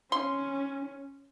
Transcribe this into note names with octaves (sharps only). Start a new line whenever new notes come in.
C#4 C6